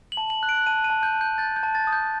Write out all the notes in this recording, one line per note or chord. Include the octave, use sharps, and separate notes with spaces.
F#7
A5
F#7
F#6
D7
A5 D#7
D#7
A5
G6
A5
G6
G6 A6
G6
A5
A6
D#6
G6